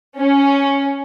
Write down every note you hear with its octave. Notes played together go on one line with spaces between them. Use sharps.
C#4